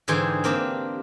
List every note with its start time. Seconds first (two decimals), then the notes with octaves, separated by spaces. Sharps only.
0.08 G#2 D3 E3 G#4 C5 G5
0.44 A#3 C4 D4 G4